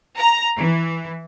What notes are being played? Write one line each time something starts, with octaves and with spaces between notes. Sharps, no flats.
A#5
E3